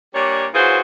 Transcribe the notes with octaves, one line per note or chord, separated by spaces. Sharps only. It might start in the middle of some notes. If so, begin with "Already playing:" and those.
A#2 G3 D4 C#5
E3 F#3 F4 G#4 C5